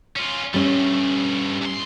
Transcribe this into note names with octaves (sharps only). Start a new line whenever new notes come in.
C#4 F4
G2 G3 A3 C#4
E2 C6